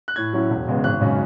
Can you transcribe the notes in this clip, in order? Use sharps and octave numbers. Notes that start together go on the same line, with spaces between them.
F#6
A2 G#6
F#3 C#4 E4
E1
E2 C#3 G#3 B3
G#1 F#6
F#2 C#3 G#3 C#4